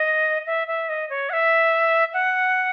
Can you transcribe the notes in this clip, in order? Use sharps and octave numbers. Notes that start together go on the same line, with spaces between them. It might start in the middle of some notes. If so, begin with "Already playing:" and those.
Already playing: D#5
E5
E5
D#5
C#5
F#5
E5
F#5